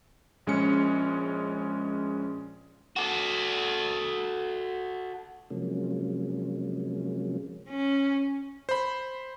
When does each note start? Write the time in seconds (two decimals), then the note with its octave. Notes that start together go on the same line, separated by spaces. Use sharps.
0.47 A#1 G#3 C#4 C#7
2.96 F#4 A4
5.50 C3 F3 F#3 G#3 A#3 C#4
7.69 C#4
8.69 C5 B5